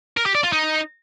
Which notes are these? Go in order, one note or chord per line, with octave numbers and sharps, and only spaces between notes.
A#4
G4
D5
F4
D#4